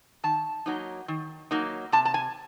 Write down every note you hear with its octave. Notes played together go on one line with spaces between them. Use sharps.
D#3 A5
F#3 A#3 D#4
D#3
F#3 A#3 D#4
C3 A5
A5
G#5